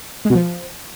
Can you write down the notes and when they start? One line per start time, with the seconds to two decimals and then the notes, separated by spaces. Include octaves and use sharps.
0.25 G#3
0.30 B2
0.35 F3